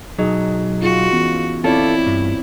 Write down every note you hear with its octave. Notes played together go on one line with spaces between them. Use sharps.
B1 F#3 D#4 G#4 D#5
F4 F#4 G#4
E3 B3 C#4
C4 E4 F4 A4 C#5 D5
G2